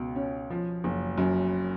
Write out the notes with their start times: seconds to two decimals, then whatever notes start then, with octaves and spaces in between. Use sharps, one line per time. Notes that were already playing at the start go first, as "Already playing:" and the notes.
Already playing: C#2 B2
0.16 C#4
0.50 F3
0.84 F#1
1.18 F#2